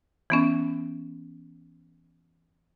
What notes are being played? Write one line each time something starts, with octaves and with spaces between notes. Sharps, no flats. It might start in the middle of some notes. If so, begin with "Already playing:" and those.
E3 B3 C#4